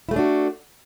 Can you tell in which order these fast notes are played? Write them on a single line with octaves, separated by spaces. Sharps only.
E4 A3 G#4 D4 F#4